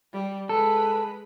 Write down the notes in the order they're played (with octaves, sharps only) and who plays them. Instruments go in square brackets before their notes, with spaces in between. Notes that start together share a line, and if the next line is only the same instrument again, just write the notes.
[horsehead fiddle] G3
[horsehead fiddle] G#3 B4 [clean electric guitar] A4